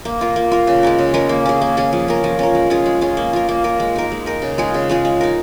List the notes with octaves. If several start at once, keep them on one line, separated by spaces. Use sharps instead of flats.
A#3
F4 A#4
A#3
F4 A#4
C#3
G#3 C#4 A#4
C#3
G#3 C#4 A#4
A#3
C#4 G#4
A#3
C#4 G#4
F3
C#4 A#4
F3
C#4 A#4
G#3
C#4 F4 G#4
G#3
C#4 F4 G#4
A#3
F4 A#4
A#3
F4 A#4
G#3
D#4 A#4
G#3
D#4 A#4
C#3
G#3 F4 G#4
C#3
G#3 F4 G#4
G#3
D#4 A#4